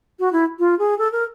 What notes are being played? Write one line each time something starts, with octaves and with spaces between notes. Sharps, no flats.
F#4
E4
F4
G#4
A4
A#4